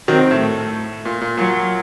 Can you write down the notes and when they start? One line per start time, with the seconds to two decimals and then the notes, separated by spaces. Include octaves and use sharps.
0.08 D#3 F#3 C4
0.31 A2
0.41 A3
1.05 A#2
1.21 A#2
1.37 A#2 F#3